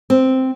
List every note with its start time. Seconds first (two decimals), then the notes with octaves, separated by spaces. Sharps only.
0.10 C4